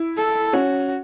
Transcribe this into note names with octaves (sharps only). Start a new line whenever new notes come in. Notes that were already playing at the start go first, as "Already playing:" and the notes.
Already playing: E4
A4
C#4 F#4